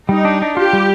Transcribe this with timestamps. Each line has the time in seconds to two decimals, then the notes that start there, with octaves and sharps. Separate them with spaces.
0.09 G3 D#4
0.25 D4
0.42 D4
0.57 F4 G4
0.73 G3